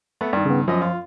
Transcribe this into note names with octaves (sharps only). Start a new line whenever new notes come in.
A3 B3
G2 D#3 D5
C#3 B3
F#2 F3 D#5
F4